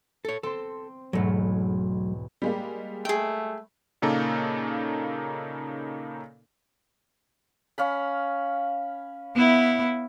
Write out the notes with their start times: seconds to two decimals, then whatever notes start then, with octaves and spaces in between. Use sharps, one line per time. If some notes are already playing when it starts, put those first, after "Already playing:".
0.25 A4 C#5
0.43 C4 A4 C5
1.13 E1 B1 G#2 F#3 A3
2.42 G3 G#3 A#3
3.05 A3 G#4 G5
4.02 A#2 C#3 A#3 D#4 A4
7.78 C#4 F5 B5
9.35 B3 E4